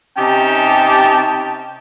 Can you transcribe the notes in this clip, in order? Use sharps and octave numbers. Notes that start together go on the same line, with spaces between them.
C3 C#4 D#4 G4 G5 A5